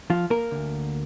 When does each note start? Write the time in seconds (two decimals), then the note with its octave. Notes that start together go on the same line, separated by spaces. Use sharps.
0.10 F3 F4
0.30 A#3 A#4
0.52 D2 D3